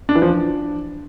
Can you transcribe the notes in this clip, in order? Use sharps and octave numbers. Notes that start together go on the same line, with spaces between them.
D4
E3
F3
D4